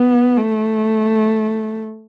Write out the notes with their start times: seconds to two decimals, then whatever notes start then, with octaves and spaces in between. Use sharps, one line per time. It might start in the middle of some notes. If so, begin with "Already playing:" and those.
Already playing: B3
0.37 A3